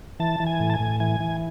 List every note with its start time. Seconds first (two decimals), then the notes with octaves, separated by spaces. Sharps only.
0.20 E3 A5
0.40 E3
0.46 G#5
0.60 A2
0.70 A5
0.74 G#5
0.80 A2
1.00 E3 G#5
1.20 E3